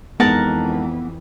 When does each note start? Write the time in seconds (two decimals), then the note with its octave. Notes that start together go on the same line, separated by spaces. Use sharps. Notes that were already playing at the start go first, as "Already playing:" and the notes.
0.20 F2 E3 G#3 B3 D#4 A#4 F#5 A5